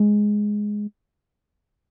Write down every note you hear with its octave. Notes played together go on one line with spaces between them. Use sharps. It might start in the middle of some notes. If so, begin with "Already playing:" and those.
Already playing: G#3